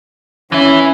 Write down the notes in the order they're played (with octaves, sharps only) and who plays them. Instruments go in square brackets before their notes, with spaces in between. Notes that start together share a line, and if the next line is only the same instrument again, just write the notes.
[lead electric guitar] E3 E4 [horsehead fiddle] C#4